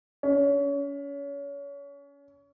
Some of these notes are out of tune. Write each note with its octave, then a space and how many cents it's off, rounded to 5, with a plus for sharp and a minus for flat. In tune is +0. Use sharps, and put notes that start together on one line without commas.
C#4 +30